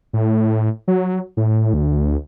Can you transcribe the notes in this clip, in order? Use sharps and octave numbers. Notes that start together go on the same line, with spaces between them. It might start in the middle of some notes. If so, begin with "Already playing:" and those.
A2
F#3
A2
D2